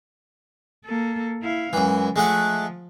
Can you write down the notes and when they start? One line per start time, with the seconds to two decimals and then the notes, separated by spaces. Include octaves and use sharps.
0.85 A#3 A4
1.43 E4 F5
1.73 F#2 E3 G#3
2.16 F3 G#3 A3 F#5